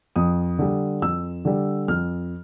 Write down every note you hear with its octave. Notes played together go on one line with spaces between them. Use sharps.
F2 D#6
D3 G3
F2 E6
D3 G3
F2 F6